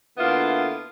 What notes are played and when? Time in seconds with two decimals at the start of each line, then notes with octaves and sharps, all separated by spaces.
0.17 D3 A#3 B3 E4 F4